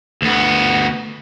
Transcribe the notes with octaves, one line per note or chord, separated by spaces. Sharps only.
D2 B3